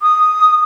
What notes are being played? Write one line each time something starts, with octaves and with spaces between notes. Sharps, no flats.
D#6